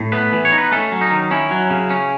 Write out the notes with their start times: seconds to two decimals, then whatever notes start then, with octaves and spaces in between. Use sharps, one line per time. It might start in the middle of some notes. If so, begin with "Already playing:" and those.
Already playing: A2
0.12 A3 B3 B4
0.32 E3
0.45 C#5
0.52 D#4
0.58 B4
0.72 A3 C#4 A4
0.92 F#3
1.01 D#4
1.11 D#3
1.31 C#4 E4
1.51 F#3
1.70 C#3
1.90 C#4